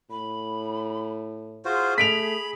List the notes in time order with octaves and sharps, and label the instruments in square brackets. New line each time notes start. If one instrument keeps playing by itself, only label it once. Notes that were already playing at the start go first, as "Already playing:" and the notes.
[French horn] A2 [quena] B5
[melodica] F4 F#4 C5 [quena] G#4
[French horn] A3 [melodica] B5 [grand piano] B6 D7 F7